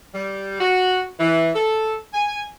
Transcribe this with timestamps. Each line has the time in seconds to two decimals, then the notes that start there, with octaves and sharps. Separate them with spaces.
0.14 G3
0.60 F#4
1.19 E3
1.55 A4
2.13 G#5